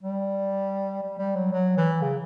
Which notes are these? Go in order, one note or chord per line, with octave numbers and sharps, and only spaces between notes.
G3
G3
G3
F#3
F#3
E3
C#3